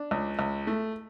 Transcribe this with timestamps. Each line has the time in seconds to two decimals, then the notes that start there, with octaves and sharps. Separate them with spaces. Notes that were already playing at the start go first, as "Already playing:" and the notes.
Already playing: D4
0.11 C#2
0.39 C#2
0.67 A3